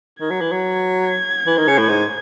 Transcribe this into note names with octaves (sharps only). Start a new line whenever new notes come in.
D#3 G#6
F#3
E3
F#3
G#6
G#6
E3
D#3
C#3
A2
G#2